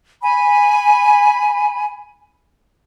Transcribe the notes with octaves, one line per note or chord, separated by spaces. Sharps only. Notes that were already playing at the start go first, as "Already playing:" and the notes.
G#5 B5